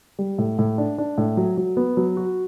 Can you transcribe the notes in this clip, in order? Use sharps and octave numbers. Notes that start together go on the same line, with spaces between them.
G3
A2
A2
D4
D4
A2
F#3
F#3
B3
F#3
F#4